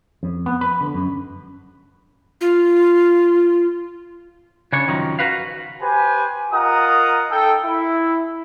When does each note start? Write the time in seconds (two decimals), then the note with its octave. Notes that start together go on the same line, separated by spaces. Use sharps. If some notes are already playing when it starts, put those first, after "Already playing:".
0.23 F2
0.46 B3
0.61 B4
0.81 D3
0.94 F#2
2.41 F4
4.73 C#3 D4 C#5
4.87 F#2 D#3 F3 F#3
5.19 F#4 B4 F5
5.82 G4 B4 C5 G#5
6.53 F4 A#4 D#5 F#5 A#5 D#6
7.31 D#4 A4 G5
7.65 E4